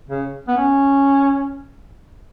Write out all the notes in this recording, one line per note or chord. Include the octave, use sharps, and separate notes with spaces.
C#3
B3
C#4